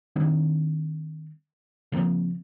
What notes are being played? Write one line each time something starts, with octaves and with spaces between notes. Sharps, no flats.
D#3 G3 C4 D4
C#3 F3 A#3 C4